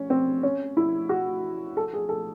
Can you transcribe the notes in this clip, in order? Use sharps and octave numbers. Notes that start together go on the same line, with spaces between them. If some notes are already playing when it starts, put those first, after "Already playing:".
Already playing: C#4
C4
C#4
E4
F#4
A4
G#4
A4